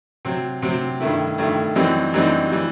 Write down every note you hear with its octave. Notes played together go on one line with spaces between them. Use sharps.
C3 F#3 C4
C3 F#3 C4
G2 D#3 A3 E4
G2 D#3 A3 E4
F#2 E3 G3 C4 D#4
F#2 E3 G3 C4 D#4
E3 G3